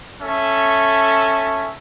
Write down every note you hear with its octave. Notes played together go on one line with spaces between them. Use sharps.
C#4 A4 E5